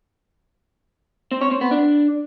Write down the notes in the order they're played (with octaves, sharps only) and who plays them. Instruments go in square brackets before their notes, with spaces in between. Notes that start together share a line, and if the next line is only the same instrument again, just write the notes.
[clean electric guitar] C4
C#5
C4
B3
D4